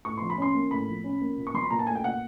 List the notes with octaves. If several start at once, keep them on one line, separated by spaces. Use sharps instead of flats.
A2 C#6
F3 C6
B5
C#4 C6
A#3
A2 B5
F3
C#4
A#3
A#2
C#6
F#3 C6
B5
A#2 A#5
A5
A3 G#5
G5
A#2 F#5